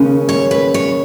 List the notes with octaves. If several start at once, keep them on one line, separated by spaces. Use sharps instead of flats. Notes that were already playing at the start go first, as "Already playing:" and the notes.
Already playing: D#2 C#3 G#3 C#4
C#5
B4
C#5